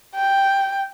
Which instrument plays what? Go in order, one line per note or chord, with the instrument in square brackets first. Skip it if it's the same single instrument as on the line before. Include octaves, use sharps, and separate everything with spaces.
[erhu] G5